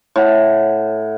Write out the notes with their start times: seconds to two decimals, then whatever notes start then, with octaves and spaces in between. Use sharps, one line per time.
0.16 A2 F#5